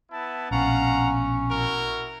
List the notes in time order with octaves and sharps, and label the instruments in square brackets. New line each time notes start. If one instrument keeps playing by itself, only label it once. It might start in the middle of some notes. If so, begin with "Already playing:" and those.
[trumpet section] B3 E4 A5
[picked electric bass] A#1 B2 [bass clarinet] C#4 [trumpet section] F5 F#5 A#5
[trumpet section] E4 F#4 A#4